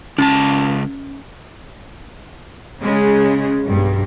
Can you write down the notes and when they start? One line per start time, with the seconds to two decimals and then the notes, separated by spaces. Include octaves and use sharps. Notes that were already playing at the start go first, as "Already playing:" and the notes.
0.18 C#2 C#4 A5
2.82 C#3 G#3
3.67 B1 G2